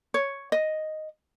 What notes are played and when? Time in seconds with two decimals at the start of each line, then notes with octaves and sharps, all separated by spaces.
0.14 C#5
0.52 D#5